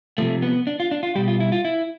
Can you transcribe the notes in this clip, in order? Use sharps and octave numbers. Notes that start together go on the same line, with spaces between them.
C3 F3 A3
B3
D4
F4
D4
F4
B2 G3 G4
F4
E4
F4
E4